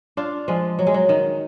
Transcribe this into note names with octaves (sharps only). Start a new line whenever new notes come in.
D4 F4
F3 G#3
F#3
G#3
F#3
D#3